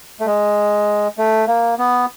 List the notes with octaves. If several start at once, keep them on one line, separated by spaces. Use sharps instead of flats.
A3
G#3
A3
A#3
B3